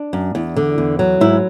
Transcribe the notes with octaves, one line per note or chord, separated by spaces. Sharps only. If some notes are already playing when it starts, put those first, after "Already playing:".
Already playing: D4
F#2
E2
D3
E2
F#3
G#2 E4